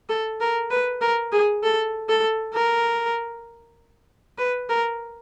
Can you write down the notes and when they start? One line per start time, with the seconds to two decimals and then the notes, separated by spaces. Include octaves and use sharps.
0.09 A4
0.40 A#4
0.71 B4
1.01 A#4
1.32 G#4
1.63 A4
2.09 A4
2.54 A#4
4.38 B4
4.69 A#4